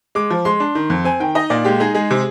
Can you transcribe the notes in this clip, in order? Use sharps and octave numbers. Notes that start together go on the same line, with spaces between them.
G#3 D6
F3
G#3 C6
D4
D#3
F2
C4 G#5
D#3 G5
D#4 D#5
A#2 D5
G#3 G4
D#4 G#4
G#3 G#4
C3